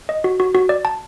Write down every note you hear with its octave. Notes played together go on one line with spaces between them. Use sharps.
D#5
F#4
F#4
F#4
D5
A5